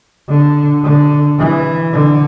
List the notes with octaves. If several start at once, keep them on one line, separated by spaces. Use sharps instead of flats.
D3
D3
E3
D3